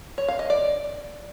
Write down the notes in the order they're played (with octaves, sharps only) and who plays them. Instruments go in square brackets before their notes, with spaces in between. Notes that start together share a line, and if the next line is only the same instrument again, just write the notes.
[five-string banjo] C#5
F5
D#5
D5